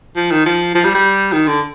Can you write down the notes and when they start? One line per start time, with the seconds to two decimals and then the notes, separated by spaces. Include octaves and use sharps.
0.16 F3
0.31 D#3
0.46 F3
0.75 F3
0.84 G3
0.94 G3
1.32 D#3
1.47 D3